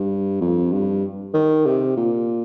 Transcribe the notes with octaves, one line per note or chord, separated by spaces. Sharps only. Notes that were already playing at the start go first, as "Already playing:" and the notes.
Already playing: G2
F2
G2
D#3
C3
A#2